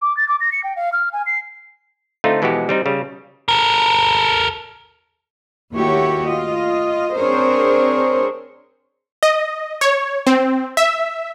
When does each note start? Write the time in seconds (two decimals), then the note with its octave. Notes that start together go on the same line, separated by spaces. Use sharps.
0.02 D6
0.17 A6
0.29 D6
0.41 A#6
0.52 C#7
0.64 G5
0.76 F5
0.93 F6
1.13 G#5
1.26 C7
2.24 D3 A3 C4 D#4 F4
2.42 B2 E3 F3 G#3 F#4 G4
2.69 G3 C4 D#4
2.86 C#3 G3
3.48 A4 A#4
5.73 D#2 A3 E4 F#4 G4 C#5
6.24 F4 D#5
7.14 C4 D4 G#4 A#4 C5 C#5
9.23 D#5
9.81 C#5
10.27 C4
10.77 E5